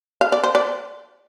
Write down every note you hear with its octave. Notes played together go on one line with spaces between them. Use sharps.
F5
D5
C5
D5